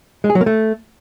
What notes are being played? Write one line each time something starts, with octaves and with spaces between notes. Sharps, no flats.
G#3
G#4
F#3
A#3
A3